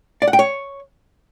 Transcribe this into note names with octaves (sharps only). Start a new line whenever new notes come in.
D5
F#5
G5
C#5